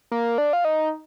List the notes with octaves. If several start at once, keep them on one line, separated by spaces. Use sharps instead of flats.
A#3
D4
F4
D#4